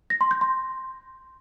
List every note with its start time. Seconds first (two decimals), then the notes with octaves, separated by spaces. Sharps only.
0.10 A#6
0.21 C6
0.31 G6
0.41 C6